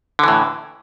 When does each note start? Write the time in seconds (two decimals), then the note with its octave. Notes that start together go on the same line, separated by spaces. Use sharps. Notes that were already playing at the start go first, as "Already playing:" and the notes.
0.19 D3
0.24 E3
0.28 A2